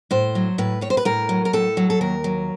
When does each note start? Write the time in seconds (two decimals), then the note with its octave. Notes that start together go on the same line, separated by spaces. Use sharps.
0.11 A2 C5
0.35 F#3
0.58 A2 B4
0.81 A2 C#5
0.90 C5
0.97 B4
1.05 A2 A#4
1.29 F#3
1.45 A#4
1.53 A2 A4
1.77 F#3
1.90 A4
2.01 D#2 A#4
2.24 F#3